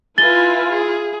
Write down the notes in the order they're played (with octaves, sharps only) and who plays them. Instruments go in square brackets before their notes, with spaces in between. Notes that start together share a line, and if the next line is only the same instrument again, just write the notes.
[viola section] E4 F4 [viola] B4 G#5 [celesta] A6 G7
[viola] G#4